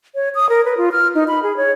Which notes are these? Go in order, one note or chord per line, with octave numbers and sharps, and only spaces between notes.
C#5
D#6
A#4
B4
F4
F6
D#4
B5
G#4
C#5